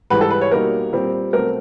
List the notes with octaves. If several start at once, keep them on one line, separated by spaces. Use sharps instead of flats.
G#2 E3 G3 B4
A4
B4
C#5
B2 G3 A#3 D#4 A#4
A#2 G3 C4
B2 F#3 A3 C4 A#4